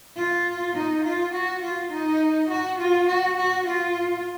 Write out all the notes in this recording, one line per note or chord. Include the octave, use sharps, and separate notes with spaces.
F4
D#4
F4
F#4
F4
D#4
F#4
F4
F#4
F#4
F4